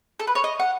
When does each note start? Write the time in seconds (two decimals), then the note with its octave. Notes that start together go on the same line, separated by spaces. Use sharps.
0.20 A4
0.27 B4
0.35 C#5
0.44 D#5
0.60 F#5